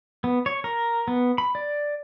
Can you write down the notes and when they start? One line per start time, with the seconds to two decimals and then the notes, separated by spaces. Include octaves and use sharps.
0.24 B3
0.46 C#5
0.64 A#4
1.08 B3
1.38 B5
1.55 D5